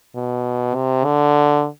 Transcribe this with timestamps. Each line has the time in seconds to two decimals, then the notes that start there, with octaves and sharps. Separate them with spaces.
0.15 B2
0.75 C3
1.05 D3